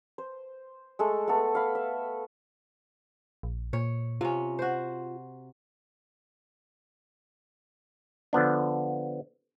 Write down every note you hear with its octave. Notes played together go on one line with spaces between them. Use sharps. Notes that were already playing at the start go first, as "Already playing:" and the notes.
C5
G#3 A3 A4
A3 B3 A4
F5 B5
E5
A#1
A#2 C#5
C3 C#4 F4
F#4 C5
D3 F3 B3 D4